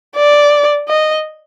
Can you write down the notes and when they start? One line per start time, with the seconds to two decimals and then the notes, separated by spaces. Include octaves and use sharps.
0.16 D5
0.88 D#5